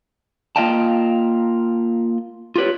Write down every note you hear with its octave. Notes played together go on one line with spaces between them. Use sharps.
A#3 F4 D#5 F5 G5 A5
F4 G4 B4 C#5